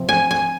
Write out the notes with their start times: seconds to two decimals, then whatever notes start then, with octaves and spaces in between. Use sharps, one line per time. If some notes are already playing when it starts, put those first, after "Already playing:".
Already playing: C3 F3
0.09 G#5
0.31 G#5